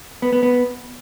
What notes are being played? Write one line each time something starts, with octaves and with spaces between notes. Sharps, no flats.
B3
B3
B3